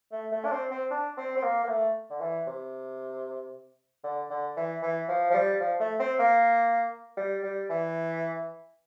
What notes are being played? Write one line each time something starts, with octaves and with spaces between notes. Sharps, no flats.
A3
A3
D4
C4
C4
D4
C4
C4
A#3
A#3
A3
D3
E3
C3
D3
D3
E3
E3
F3
F3
G3
F3
A3
C4
A#3
G3
G3
E3